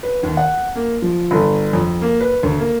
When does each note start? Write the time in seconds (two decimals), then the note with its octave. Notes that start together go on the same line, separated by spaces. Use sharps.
0.03 B4
0.23 D#2
0.37 F#5
0.75 A#3
1.02 F3
1.31 G1
1.73 F2
2.02 A#3
2.21 B4
2.43 D2
2.59 A#3